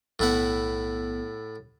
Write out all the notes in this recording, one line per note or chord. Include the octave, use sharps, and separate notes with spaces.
B1 A2 B3 E4 F#5